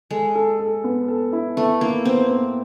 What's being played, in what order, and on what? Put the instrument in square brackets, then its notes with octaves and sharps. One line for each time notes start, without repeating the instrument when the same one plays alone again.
[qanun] G#3 [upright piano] A4
[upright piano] A4
A4
B3
A4
E4
[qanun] A3 [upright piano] B3
[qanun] A#3 [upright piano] E4
[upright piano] B3 [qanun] C4
[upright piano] B3